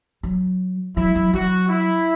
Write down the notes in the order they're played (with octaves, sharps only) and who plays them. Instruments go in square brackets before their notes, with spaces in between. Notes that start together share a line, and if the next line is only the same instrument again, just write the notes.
[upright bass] F#3
[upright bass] F#3 [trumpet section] E4
[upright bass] F#3
[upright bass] F#3 [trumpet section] F#4
[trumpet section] E4